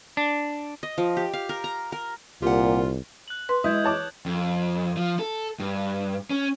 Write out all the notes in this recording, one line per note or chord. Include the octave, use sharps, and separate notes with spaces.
D4
D#5
F3
G4
F5
A#4
A#5
A#4
C2 A#2 F4 G4 F#5
F#6 F#7
B4 C6
G#3 E4 D#5 E5 D#6 G6 G#6
C#5 A5 D6
F2
F3
A4
G2
C#4